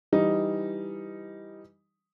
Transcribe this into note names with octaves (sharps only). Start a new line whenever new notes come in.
E3 G3 D#4